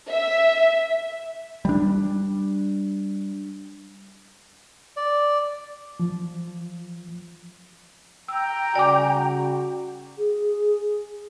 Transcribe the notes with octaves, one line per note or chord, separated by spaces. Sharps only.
E5
G3 D4
D5
F3
G5 A#5 E6
C#3 G3 F#4 D5 G#5 D6
G#4